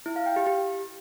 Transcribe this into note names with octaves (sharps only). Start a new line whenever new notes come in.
E4
F5
G5
G4
G4